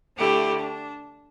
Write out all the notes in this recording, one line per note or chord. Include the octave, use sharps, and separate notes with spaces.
D3 A3 E4 G4
D4